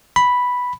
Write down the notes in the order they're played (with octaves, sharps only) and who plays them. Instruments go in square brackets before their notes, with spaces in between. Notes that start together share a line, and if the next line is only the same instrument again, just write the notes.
[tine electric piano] B5